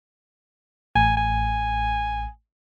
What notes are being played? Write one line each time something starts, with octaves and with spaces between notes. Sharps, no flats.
A1 G#5
G#5